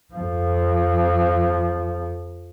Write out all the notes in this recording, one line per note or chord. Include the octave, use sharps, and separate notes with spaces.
F2 F3